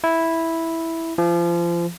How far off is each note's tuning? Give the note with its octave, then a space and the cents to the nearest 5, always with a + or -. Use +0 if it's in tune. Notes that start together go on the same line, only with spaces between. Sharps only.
E4 -5
F3 -30